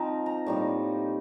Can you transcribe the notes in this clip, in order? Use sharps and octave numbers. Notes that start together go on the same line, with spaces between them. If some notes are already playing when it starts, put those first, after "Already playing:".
Already playing: F3 C4 D#4 A#5
A#5
A2 G3 A#3 D#4